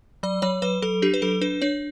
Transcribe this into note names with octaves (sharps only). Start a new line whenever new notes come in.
F#3 D5
F#3 C#5
F#3 B4
F#3 A4
D4 G4
B4
F#3 A4
D4 B4
D4 C#5